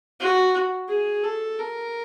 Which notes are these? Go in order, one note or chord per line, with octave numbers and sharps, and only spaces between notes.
F#4
G#4
A4
A#4